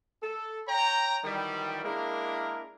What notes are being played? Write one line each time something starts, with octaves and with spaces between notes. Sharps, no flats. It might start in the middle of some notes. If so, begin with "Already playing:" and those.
A4
C#5 G5 A#5
D#3 E3 F#3 G3
G#3 A#3 D4 E4 A#4